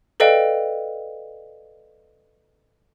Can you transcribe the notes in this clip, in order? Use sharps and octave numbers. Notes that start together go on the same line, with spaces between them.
A4 B4 D5 D#5 F5 G5